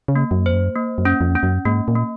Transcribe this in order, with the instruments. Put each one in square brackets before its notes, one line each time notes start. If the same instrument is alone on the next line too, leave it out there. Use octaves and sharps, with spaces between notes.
[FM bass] C#3
[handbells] A#3
[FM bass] F#2
[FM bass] F2 [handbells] C5
[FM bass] F#2
[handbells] A#3
[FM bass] F#2
[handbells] C#4
[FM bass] F2
[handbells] C#4
[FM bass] F#2
[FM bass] G#2 [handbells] A#3
[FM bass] A#2
[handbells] A#3